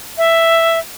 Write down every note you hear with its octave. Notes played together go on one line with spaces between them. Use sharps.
E5